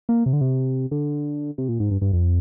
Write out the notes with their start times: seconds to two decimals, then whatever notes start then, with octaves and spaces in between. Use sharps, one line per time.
0.09 A#3
0.26 C3
0.33 D3
0.41 C3
0.91 D3
1.58 C3
1.68 A#2
1.80 G#2
1.91 G2
2.02 G2
2.13 F2